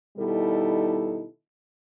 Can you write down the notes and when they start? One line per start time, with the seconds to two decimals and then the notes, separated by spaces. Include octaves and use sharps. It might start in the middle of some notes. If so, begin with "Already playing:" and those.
0.18 B2 D#3 G3 D#4 E4 A4